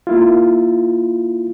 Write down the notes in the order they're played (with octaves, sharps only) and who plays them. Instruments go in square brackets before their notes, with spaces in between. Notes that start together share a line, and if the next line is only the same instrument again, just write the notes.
[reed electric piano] A#3 E4 F4